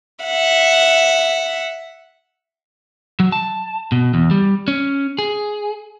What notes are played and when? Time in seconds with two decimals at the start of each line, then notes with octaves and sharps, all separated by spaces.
0.25 E5 F#5
3.20 F#3
3.32 A5
3.92 B2
4.14 E2
4.31 G3
4.68 C#4
5.19 G#4